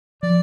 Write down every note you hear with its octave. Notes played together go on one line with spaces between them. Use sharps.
F3 D5